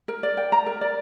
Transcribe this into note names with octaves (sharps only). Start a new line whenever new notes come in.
A#4
D5
G5
A#5
A#4
D5